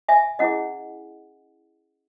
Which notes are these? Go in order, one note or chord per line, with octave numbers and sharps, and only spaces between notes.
E5 G#5
C#4 E4 G#4 D#5 F#5